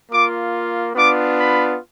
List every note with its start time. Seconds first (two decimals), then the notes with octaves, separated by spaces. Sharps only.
0.12 A#3 F4 D6
0.96 B3 D4 F4 D6
1.38 B5